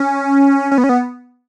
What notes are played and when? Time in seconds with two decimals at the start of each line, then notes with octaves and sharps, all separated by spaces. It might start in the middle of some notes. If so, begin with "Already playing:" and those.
Already playing: C#4
0.71 C#4
0.78 B3
0.84 C#4
0.89 B3